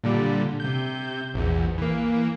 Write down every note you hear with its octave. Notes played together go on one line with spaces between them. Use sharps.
A#2 D3 G3
C3 G6
A#1 E2
E3 A#3